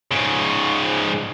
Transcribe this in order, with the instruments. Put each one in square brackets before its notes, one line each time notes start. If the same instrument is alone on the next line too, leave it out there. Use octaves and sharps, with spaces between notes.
[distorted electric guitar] G#2 C#3